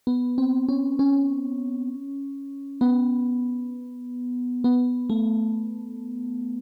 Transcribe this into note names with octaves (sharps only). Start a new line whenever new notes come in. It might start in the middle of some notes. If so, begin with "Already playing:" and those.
B3
C4
C#4
C#4
B3
B3
A3